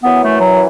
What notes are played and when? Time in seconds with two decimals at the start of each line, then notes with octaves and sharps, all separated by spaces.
0.03 F#2 E3 B3
0.22 A3
0.40 F#3